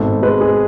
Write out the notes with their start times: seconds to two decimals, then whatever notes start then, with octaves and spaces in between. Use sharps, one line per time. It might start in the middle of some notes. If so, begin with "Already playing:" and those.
Already playing: G#1 B2 A4
0.23 G#3 B4
0.41 G#4